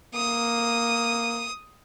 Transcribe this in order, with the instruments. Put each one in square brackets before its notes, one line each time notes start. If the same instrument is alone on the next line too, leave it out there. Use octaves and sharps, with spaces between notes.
[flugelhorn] A#3 [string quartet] D#6